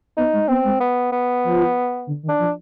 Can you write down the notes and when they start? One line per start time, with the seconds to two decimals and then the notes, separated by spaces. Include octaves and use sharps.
0.17 B3 D#4
0.33 G#3
0.48 B3 C4
0.65 G#3
0.80 B3
1.12 B3
1.44 F3
2.07 D3
2.23 D#3
2.29 D4
2.39 F3